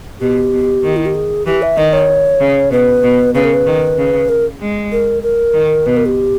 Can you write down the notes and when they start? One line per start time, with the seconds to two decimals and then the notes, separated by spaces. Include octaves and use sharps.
0.20 B2 G4
0.52 B2
0.84 D#3
0.96 E4
1.05 G4
1.15 G#4
1.46 E3 G4
1.62 E5
1.77 D#3 D#5
1.93 C#5
2.40 C#3
2.71 B2 B4
3.03 B2
3.35 C#3 B4
3.44 A#4
3.54 B4
3.66 D#3
3.98 C#3
4.29 A#4
4.61 G#3
4.92 A#4
5.23 A#4
5.54 D#3
5.86 B2 B4
5.96 A#4
6.07 G4